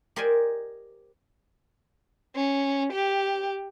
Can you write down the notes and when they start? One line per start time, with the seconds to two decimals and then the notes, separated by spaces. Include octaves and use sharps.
0.16 G4 A#4 C5 D5 D#5 G#5
2.36 C#4
2.93 G4